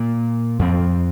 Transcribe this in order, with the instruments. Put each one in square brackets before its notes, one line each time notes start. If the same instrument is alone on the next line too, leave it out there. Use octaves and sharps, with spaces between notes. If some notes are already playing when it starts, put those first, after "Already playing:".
Already playing: [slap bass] A#2 A#3
F2 F3 C4